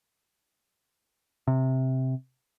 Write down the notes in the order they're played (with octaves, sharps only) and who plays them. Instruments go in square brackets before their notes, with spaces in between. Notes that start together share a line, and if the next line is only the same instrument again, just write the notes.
[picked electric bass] C3